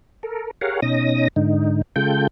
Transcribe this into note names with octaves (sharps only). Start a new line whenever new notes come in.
A4 A#4
G4 G#4 A#4 C#5 F5 F#5
B2 C#4 D#4 D#6 A#6
G#2 D3 D#4
C#3 G#3 F4 A4 G5 G6